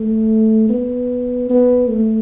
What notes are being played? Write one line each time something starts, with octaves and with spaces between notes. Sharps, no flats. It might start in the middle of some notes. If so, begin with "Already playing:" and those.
Already playing: A3
B3
B3
A3